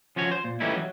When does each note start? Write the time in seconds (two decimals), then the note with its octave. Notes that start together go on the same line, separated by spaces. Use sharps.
0.16 F3 C#4 F#4 C#5
0.31 C5
0.44 A#2
0.60 E3 G3 A3 C#4 D#4 E4
0.75 F#3